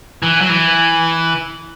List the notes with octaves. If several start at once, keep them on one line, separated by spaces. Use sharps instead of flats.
E3
F#3
E3